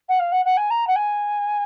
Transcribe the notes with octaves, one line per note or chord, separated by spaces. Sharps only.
F#5
F5
F#5
F#5
G#5
A#5
F#5
G#5